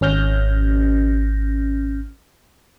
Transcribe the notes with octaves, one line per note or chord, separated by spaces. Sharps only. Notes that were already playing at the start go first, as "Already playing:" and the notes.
G#1 C#4 F6 G6 A#6